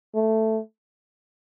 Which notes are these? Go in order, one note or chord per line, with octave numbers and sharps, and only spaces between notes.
A3